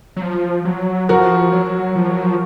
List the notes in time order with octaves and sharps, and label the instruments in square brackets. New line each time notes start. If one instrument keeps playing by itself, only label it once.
[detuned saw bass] F#3
F3
F#3
[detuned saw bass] F3 [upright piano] F#4 A#4
[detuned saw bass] F#3
F3
F#3
F3